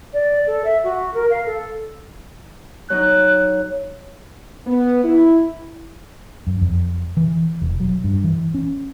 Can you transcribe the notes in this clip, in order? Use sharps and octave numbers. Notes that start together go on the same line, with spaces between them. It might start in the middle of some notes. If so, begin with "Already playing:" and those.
D5
A4
E5
F#4
A#4
F5
A4
F#3 D#4 F#6
B3
E4
F#2
F2
E3
E1
F#3
G2
E3
C#4